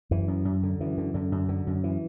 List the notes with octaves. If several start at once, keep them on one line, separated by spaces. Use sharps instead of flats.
F#2 E3
F#2
F#2
D3
F#2 E3
D3
F#2 D3
F#2
D3
F#2
E3